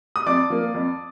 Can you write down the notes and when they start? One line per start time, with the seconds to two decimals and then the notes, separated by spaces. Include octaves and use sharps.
0.16 D#6
0.26 F2 D5 D6
0.50 F3 A#3
0.75 F2